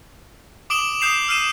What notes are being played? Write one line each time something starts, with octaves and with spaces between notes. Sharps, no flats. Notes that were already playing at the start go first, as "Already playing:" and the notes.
D6 D#6 D7 E7 F#7 G7
D#6 G6 C7 E7 F7
E6 F6 C7 D#7 E7